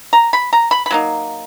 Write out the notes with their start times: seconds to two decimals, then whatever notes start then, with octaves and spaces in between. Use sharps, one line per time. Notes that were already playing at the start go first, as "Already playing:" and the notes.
0.13 A#5
0.33 B5
0.53 A#5
0.71 B5
0.86 B5
0.91 F#3 A#3 D#4